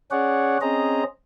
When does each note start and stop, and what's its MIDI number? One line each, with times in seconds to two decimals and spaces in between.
0.11 0.58 61
0.11 0.58 68
0.11 0.58 73
0.11 0.58 74
0.11 0.58 78
0.61 1.03 60
0.61 1.03 61
0.61 1.03 68
0.61 1.03 72
0.61 1.03 75
0.61 1.03 82